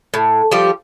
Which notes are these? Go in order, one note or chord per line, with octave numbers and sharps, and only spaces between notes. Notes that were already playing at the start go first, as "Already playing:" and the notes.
A2
F3 G3 G4